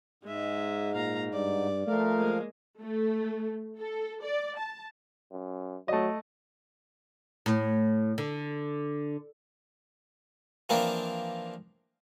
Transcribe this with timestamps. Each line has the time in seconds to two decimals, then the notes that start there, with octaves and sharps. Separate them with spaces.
0.23 G#2 G#3 E5
0.95 A#2 F5 A#5
1.33 G2 D5
1.87 F3 A3 A#4 F5
2.18 G#3 A#3
2.81 A3
3.79 A4
4.23 D5
4.59 A5
5.32 F#2
5.88 F#3 A3 D#5
7.46 A2
8.18 D3
10.69 E3 F3 A#3 C4 D4 A#4